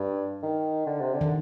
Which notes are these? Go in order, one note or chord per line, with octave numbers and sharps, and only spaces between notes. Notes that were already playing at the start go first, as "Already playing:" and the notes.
Already playing: G2
D#3
D3
C3
D3
D#3